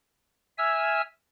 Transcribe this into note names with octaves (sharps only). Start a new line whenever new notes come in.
E5 G#5 E6 F6